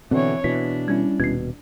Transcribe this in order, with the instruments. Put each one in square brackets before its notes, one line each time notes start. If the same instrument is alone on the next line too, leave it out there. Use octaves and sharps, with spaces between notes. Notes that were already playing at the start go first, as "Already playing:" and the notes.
[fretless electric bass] B2 D3 [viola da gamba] E3 C#5 [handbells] C4
[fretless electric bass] B2 E3 [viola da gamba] D4 [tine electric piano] B6
[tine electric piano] G3 C#4 E4 [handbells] G#6
[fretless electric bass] D#1 B2 [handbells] G#6 C7